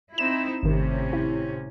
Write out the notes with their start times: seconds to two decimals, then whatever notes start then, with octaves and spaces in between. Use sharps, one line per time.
0.18 C4 D#4 E4 E7
0.63 G#1 A2 C3 D#3 C#4
1.13 E4